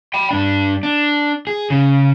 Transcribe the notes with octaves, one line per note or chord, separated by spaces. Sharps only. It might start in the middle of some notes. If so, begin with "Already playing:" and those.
G5 B5
G2 D4
D4
G#4
C#3